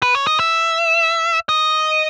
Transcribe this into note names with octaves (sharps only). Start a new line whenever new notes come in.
B4
C#5
D#5
E5
D#5